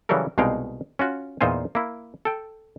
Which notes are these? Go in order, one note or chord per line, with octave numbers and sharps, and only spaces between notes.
C#3 E3 F#3 G3 A4 A#4
C2 B2 G#3 D#4 F5 G5
C#4 F4 F#4
E2 A#2 D#4 F4 C5 G#5
A#3 E4
A4 G5